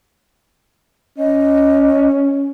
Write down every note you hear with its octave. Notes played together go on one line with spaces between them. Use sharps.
C#4 D#5